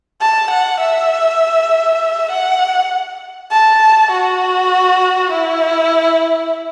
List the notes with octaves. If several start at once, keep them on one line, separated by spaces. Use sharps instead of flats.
A5
F#5
E5
F#5
A5
F#4
E4